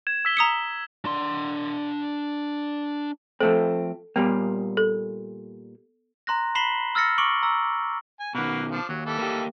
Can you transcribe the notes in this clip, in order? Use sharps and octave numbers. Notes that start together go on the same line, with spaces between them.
G#6 E7
E6 B6 G7
A#5 D#6 C#7
D4 C6
F3 A3 C4 A4
A#2 G3 A#3 B3
A4
A#5 C6 F#6 A#6
B5 B6 C7 E7 F#7 G7
E6 F6 A6 A#6 C#7
C#6 D6 C#7 D7 F#7 G7
A#5 E6
G#5
B2 D#3 A#3 F#4 B4
F3 D4
D#2 F#3
E3 G3 A4
A#3 G4